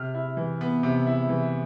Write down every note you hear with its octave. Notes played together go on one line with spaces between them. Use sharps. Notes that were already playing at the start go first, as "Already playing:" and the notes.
Already playing: C3 F6
E4
E3
B3
C3
E4
E3